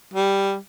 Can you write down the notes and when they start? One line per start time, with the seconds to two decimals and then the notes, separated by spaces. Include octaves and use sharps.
0.14 G3